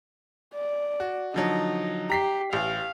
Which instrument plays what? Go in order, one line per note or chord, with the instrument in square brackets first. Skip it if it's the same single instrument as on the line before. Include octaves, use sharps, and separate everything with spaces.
[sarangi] D5
[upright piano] F#4
[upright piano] D3 F3 F#3 [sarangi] D#4
[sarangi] G4 [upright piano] A#5 B6 C7
[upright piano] A1 [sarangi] F5